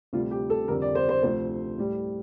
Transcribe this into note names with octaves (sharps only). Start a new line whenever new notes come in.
D2 C3 G3 F4
G4
A4
F2 D3 G3 A#4
D5
C5
C5
D2 C3 F3 C5
A2 G3